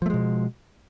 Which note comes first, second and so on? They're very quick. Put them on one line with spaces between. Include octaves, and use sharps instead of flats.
F3 A3 G#3 B2